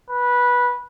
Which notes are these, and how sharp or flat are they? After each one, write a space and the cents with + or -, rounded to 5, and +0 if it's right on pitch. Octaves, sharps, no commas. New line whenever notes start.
B4 -15